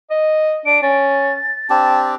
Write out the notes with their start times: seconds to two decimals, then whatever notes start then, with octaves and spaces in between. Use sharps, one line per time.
0.11 D#5
0.66 D4 D7
0.83 C#4 A6
1.70 C4 D4 G4 A5